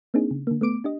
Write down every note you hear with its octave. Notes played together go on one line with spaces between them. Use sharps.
A#3 C4 D4 D#4 G#4
C#3
D3 A#3
A3 B3 D6 D7
D4 G4 D#5